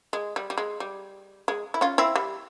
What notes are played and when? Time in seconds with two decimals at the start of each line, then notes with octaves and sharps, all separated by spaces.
0.13 G#3
0.36 G3
0.50 G3
0.58 G#3
0.80 G3
1.48 G#3
1.74 E4
1.81 C#4 F4
1.98 C4 E4
2.16 G3